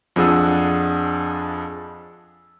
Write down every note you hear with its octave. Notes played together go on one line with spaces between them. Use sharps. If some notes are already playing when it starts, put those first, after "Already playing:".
F2 F3 D4 G#4 F#5 E6